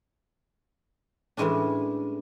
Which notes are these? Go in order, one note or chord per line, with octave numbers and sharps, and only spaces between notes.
A2 E3 G3 G#3 C#4 D4